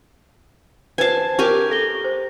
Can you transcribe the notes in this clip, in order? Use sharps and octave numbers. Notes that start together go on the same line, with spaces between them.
B4 C5 G#5 A5 C7
G4 A#4 G#5 C#6
A4 A#6 G7
C5